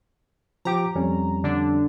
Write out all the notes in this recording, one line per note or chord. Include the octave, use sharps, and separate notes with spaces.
F3 G4 A#5 D6
F2 G3 C#4
D3 D4